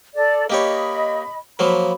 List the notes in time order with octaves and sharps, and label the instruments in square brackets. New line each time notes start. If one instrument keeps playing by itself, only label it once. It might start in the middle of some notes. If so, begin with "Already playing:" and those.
[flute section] A4 D5
[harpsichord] A#3 G4 C#5 [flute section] D#5 B5
[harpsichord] F3 F#3 A#3 [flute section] B5